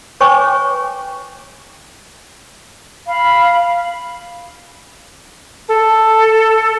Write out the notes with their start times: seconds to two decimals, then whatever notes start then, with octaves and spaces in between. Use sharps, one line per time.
0.20 B4 C#5 G5 G#5 C#6 D6
3.07 F5 B5
5.68 A4